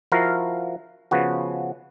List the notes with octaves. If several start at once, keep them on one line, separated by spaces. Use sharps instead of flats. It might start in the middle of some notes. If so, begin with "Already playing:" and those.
F3 E4 F#4 A#4 F5 A#5
C#3 F3 B3 F#4